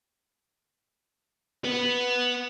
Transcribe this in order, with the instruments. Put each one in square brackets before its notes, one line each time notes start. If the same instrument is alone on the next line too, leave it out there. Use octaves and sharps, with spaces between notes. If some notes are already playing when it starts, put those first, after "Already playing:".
[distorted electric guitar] B4 F#5